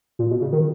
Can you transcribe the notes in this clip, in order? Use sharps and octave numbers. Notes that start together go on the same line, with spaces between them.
A#2
B2
C#3
D#3